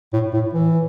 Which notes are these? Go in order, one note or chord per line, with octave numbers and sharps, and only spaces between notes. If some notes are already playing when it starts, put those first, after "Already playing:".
A2
A2
E3